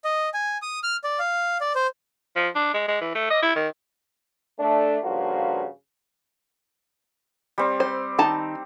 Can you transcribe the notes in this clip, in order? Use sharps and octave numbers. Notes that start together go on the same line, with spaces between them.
D#5
G#5
D#6
F6
D5
F5
D5
C5
F3
D4
G#3
G#3
E3
A3
D#5
E4
D#3
A3 D4
G2 C#3 F3 A#3 F4 F#4
G3 C4
C5
D#3 D#4 A5